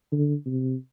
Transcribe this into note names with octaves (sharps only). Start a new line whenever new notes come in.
D3
C3